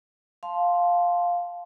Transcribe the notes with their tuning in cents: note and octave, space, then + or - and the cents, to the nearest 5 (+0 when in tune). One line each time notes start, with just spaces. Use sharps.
F5 +5 A5 -15 C6 +0